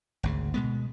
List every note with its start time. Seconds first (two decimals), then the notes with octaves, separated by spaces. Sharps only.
0.23 G#1 D2 C#3
0.54 B2 G#3 B3